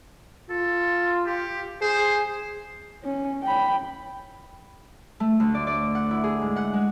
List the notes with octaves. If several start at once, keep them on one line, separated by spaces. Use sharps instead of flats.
F4 A4
G4
G#4 C5
C#4
G5 B5
A3
D2
D5
D5
F#5
E4
G#4
G#2
F#5
G#3